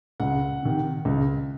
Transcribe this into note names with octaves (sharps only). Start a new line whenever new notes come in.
C#2 F#5
C3 D#3
C#2